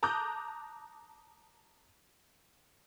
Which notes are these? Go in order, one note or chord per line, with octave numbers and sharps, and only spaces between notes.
A5 A#5 D6 D#6 F#6 G6